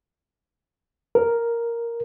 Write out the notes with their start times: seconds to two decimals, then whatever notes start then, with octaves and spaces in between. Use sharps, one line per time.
1.15 A#4